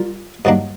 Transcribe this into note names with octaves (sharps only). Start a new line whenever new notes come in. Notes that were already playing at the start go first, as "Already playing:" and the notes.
Already playing: G3 F4 A#4
G2 D#3 F#3 A#3 D4